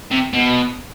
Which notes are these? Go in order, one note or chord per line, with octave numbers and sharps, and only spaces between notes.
C3
B2